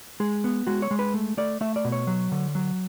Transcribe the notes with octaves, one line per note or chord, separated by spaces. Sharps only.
G#3 G#4
B3
G#3 F#4
C#5
G#3
B4
A3
A3 D5
A3 E5
D5
B2
C#5
F#3
D3
F#3